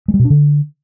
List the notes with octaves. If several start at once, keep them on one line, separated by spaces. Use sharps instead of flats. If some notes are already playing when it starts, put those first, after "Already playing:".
G#3
G3
B2
D4
D3